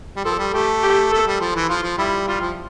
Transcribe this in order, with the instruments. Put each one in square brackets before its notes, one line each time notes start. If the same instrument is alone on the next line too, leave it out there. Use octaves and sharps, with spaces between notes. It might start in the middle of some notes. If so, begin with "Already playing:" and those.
[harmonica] G3
[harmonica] F3 [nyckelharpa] A4
[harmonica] G3
[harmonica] A3 [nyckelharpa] G4
[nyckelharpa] G4
[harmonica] A3 [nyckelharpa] A4
[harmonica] G3
F3
E3
[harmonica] F3 [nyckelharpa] F4
[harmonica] F3
[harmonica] G3 [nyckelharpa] E4
[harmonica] G3 [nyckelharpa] F4
[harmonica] F3